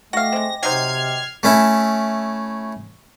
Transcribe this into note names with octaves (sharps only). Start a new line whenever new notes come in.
A3 F#4 D#5 F5 G5 D6 A#6
G#3 C4
C3 F#3 D#4 C5 F6 G#6 C7
A3 C#4 E4